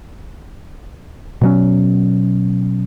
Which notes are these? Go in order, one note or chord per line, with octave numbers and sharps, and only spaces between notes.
B2 F#3 C#4